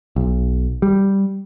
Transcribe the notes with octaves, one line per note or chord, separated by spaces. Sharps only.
B1
G3